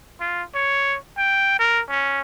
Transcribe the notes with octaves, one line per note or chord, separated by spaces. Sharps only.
F4
C#5
G5
A#4
C#4